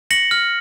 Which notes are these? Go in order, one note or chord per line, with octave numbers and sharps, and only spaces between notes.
A#6 C#7 F#7
F6